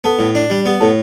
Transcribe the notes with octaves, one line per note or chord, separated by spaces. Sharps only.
B3 A4
A2
D4
G3
B3 G4
A2 A4